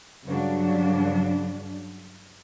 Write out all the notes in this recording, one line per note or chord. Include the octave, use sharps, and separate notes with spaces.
G2 C#3 F#3 D4